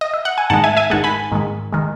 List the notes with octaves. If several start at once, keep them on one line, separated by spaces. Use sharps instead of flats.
D#5
E5
F#5
G#5
G#2 D#3 G#3 F#5 A5
E5 G#5
E5 G#5
G#2 D#3 G#3 F#5 A5
G#5 B5
G#2 D#3 G#3
D#3 G#3